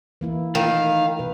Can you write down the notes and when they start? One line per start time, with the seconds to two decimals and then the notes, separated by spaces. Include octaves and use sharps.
0.21 E3 A#3 E4
0.55 D#3 A3 F5
1.19 B2 B4